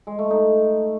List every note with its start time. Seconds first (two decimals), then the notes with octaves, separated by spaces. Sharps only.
0.07 G#3
0.19 A3
0.30 D#4